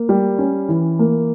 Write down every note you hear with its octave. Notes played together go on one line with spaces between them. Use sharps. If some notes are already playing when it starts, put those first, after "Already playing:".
Already playing: A#3
G3
C#4
E3
A#3